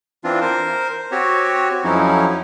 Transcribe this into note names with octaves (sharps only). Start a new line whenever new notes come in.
E3 C4 D4 F4
A#4 C5
C4 F#4 G4 C#5
F2 F3 F#3 C#4 D#4 E4